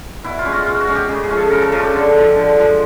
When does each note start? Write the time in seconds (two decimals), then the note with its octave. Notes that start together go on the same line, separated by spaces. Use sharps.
0.24 B2 E4
0.39 F4
0.45 G#3 C#4
0.52 F#4
0.66 B2 F4
0.80 F#4
0.87 G#3 C#4
0.95 G4
1.09 C#3 G#4
1.23 G#4
1.30 F3 G#3 C#4
1.37 A4
1.51 C#3 A#4
1.62 A4
1.72 F3 G#3 C#4 A4
1.83 G4
1.94 D3
2.15 F3 G#3
2.36 D3
2.57 F3 G#3